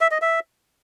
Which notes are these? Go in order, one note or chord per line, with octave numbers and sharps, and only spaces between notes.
E5
D#5
E5